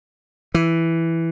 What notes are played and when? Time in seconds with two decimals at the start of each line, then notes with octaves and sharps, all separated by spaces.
0.54 E3